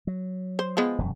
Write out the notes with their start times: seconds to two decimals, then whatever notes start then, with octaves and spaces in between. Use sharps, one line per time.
0.07 F#3
0.59 C5
0.77 F3 G#3 B3
0.98 E1 F#2 C3